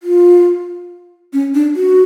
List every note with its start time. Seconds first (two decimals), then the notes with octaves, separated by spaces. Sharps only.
0.03 F4
1.33 C#4
1.54 D4
1.76 F#4